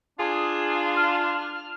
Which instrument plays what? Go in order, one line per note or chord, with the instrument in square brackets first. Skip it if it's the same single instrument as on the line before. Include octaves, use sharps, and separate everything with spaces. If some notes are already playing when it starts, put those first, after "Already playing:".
[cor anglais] D4 [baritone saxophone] F4 [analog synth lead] G#4
[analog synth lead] F6